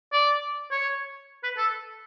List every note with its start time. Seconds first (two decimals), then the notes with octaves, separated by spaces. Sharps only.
0.12 D5
0.71 C#5
1.43 B4
1.57 A4